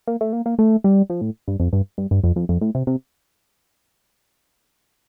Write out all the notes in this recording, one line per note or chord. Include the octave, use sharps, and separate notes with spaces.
A#3
A3
A#3
A#3
A3
G3
F3
A2
G2
F2
G2
G2
G2
F2
F2
F2
A2
C3
C3